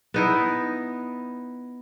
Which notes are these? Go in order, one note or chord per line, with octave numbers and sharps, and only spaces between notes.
B3 D#4 E4